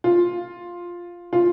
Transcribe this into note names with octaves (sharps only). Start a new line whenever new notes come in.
F4
F4